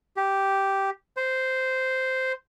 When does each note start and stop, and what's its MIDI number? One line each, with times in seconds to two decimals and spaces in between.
0.17 0.90 67
1.17 2.32 72